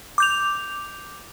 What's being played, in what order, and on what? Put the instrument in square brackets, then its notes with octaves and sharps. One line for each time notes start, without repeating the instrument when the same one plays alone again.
[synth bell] D6 G6 F7